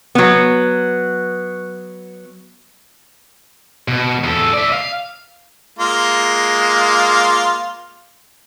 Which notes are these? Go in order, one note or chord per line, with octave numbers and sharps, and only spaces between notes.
F#3 B3
B2
E2 A4
D5 E5
F5
G#3 A#3 F4